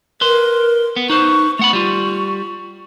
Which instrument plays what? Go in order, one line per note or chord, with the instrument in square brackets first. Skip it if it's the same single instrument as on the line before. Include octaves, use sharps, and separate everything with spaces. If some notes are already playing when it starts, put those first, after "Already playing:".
[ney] A#4 [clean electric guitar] B4 C6
[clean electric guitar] B3
[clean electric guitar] D#4 B4 C5 [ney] C#6
[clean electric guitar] A3 F#5 B5 [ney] C#6
[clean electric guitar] G3 F4